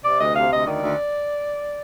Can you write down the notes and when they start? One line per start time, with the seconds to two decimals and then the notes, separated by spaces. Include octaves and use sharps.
0.04 C3 D5
0.20 D2 D#5
0.35 C3 F5
0.51 D2 D#5
0.67 D#3 D5
0.82 D2